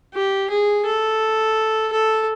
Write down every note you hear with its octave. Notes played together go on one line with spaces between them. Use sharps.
G4
G#4
A4
A4